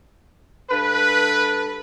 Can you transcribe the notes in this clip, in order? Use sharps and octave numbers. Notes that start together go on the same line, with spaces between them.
G2 A4 B4